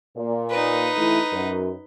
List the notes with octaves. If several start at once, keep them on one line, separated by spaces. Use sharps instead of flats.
A#2
D#4 B4
E3 A3 E4
F#2